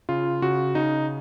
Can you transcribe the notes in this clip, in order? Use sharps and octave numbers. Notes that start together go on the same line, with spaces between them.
C#3 F4
C#3 F#4
C#3 D#4